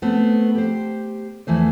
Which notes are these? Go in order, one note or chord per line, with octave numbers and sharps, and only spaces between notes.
A3 B3 C4
G4 C5
E2 E3 A3 C5